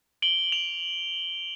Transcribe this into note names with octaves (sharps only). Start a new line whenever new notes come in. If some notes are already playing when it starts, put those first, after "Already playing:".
D7 F#7 G7
F7